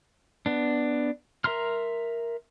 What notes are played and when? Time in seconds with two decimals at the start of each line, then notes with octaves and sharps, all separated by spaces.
0.46 B3 D4
1.44 A#4 E5 A#5 C6 F6